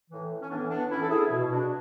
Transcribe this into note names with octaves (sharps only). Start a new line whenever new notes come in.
A2 E3
C#4
A2 E3 B3 D4
B3 D4
A2 E3 C#4 E4
A4
E4 G#4
B2
D4 F#4